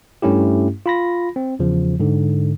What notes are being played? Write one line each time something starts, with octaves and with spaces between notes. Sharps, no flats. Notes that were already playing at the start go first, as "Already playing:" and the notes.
G2 A3 C#4 E4 G4
F4 B5 A#6
C4
E2 C#3 F3
G#2 D3